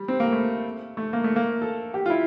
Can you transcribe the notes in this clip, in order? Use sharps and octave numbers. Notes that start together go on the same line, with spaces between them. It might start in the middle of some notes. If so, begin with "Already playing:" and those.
Already playing: G3
C4
A#3
A3
A3
A#3
A3
A#3
A4
G4
F4
E4